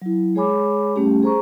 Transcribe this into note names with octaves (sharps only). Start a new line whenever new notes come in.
F#3 E4
G#3 G#4 C#5 G#5 B5 D6
G3 A3 C#4 G4
G#4 C5 A#5 C#6